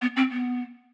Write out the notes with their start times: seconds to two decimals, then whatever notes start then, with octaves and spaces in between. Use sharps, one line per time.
0.02 B3
0.16 C4
0.31 B3